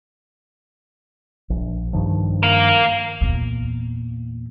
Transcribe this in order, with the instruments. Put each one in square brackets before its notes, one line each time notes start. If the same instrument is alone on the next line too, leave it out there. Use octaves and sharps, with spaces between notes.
[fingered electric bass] A#1
G2 D#3 F3
[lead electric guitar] A#4 F5
[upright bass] E2 A#2